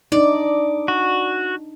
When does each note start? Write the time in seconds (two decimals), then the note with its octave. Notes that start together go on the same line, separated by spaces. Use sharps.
0.12 D4 D#4 D5
0.88 F#4